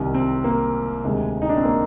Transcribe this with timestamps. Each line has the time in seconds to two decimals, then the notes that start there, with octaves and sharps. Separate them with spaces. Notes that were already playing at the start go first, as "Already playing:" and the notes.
Already playing: C2 C3 D#3
0.14 C4
0.44 A#3
1.04 D2 C3 D#3 G#3
1.42 D#4
1.49 D4
1.57 C4
1.65 A#3